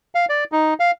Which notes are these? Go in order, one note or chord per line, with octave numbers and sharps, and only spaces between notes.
F5
D5
D#4
F5